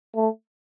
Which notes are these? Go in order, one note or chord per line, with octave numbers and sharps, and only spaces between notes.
A3